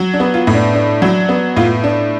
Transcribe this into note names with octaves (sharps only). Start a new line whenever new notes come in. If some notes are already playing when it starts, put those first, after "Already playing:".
Already playing: F#3
D4
B3
F4
A2
D4
D4
F#3
B3
A2 F4
D4